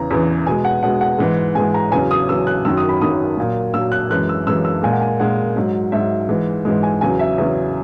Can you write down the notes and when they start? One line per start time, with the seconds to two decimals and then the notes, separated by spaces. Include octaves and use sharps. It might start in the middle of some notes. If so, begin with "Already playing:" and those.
Already playing: E2 C#3 E3 A#5
0.11 E2 C#3 E3
0.46 B2 G#3 G#5
0.65 F#5
0.83 B2 G#3 F#5
1.01 F#5
1.19 G#2 E3 G#3
1.55 G#2 E3 G#3 G#5
1.74 A#5
1.92 E2 C#3 F#3 G#5
2.11 D#6
2.29 E2 C#3 F#3 E6
2.47 F#6
2.65 F#2 D#3 F#3 E6
2.77 D#6
2.89 B5
3.01 F#2 D#3 F#3 D#6
3.37 A#2 F#3
3.74 A#2 F#3 E6
3.92 F#6
4.10 F#2 E3 G#3 F#6
4.29 E6
4.47 F#2 E3 G#3 E6
4.65 E6
4.83 A#2 G#3 G#5
4.92 F#5
5.01 G#5
5.20 A#2 G#3 F#5
5.56 G#2 F#3
5.92 G#2 F#3 E5
6.29 G#2 E3 G#3
6.65 G#2 E3 G#3
6.83 G#5
7.01 E2 C#3 F#3 G#5
7.19 E5
7.38 E2 C#3 F#3